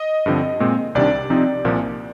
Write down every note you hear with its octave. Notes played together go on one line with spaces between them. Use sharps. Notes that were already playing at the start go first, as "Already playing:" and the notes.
Already playing: D#5
G2 D3 F3 C4
A#2 G#3 C4
C2 C3 D#3 G3 D4 D5
C3 F3 C4 D#4
C2 A#2 F3 A#3